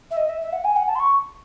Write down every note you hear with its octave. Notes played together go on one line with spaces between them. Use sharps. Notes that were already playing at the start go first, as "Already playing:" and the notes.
E5
D#5
E5
E5
F#5
G#5
F#5
A5
C6
C#6